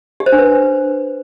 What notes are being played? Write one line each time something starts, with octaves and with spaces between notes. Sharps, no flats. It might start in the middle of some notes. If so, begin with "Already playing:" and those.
G4
C5
D4
B4